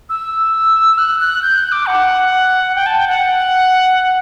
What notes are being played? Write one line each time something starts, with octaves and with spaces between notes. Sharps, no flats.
E6
F#6
F#6
G6
F#6
D6
F#5
G5
A5
G5
F#5